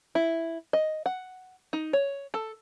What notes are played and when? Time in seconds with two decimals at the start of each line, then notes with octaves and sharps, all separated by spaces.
0.15 E4
0.73 D#5
1.06 F#5
1.73 D#4
1.93 C#5
2.34 A4